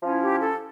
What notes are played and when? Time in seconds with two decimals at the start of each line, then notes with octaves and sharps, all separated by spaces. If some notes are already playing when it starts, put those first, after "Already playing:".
0.03 F3 C#4 E4
0.23 G4
0.43 A4